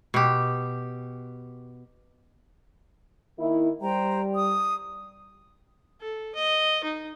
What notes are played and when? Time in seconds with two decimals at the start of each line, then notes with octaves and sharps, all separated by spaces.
0.14 B2 G4
3.38 D#3 A#3 E4
3.81 G3 C5 G5 A#5
4.34 D#6
6.00 A4
6.35 D#5
6.84 D#4